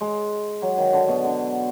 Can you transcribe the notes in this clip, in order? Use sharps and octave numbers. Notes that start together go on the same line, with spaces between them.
G#3
F#3
D#3
D3
B2
D3